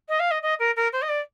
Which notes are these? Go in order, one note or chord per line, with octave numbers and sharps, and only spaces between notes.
D#5
F5
D#5
D#5
A#4
A#4
C5
D#5
D5